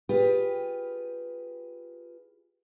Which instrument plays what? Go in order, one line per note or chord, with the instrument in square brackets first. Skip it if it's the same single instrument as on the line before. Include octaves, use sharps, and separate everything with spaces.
[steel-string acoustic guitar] F4 G4 G#4 B4